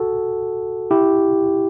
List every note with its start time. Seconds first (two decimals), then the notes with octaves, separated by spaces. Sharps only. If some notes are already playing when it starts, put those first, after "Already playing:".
Already playing: F#4 A4
0.91 E4 G4